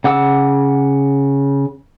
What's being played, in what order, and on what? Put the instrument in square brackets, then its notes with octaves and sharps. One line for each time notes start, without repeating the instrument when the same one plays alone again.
[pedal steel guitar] C#3 F#5 D6 E6